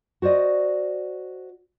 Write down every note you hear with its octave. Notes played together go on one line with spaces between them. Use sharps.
F#4 C5 D5 D#5